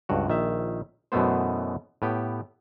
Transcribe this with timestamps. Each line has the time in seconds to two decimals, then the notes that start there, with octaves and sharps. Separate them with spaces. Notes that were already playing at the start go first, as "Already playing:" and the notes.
0.09 C#2 G2 F#4
0.28 A#1 D#3 E5
1.12 F#2 B2 E3 A3 B3 C5
2.02 A2 B3 G4